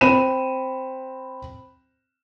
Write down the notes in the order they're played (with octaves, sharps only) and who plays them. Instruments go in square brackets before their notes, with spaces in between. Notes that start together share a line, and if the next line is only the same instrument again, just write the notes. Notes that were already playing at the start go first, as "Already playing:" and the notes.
[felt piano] C4 B5 D#7 E7